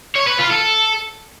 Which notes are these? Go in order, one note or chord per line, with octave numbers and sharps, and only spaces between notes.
C#5
B4
F4
A4